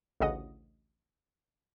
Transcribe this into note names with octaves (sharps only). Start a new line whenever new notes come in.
A1 D2 C#3 D#5 F#5 D#6